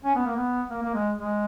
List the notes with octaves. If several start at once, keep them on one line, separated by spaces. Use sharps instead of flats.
C#4
B3
A#3
B3
A#3
A#3
G#3
G#3